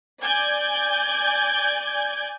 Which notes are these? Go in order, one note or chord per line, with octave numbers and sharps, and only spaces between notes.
D5 G#5 G6 G#6